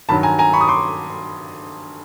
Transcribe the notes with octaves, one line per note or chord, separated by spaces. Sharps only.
G2 D#3 F#3 A5 B5
G#5 A#5
G#5 A#5
B5 C#6
D#6
C6 D6